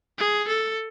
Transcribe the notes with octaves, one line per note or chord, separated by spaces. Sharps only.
G#4
A4